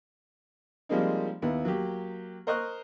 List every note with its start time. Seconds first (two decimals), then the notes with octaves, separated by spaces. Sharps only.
0.89 F3 G3 G#3 A#3 C4 D#4
1.42 D#2 B3 E4
1.65 F#3 A#3 G4
2.47 A#4 C5 D#5 C#6 D#6 F#6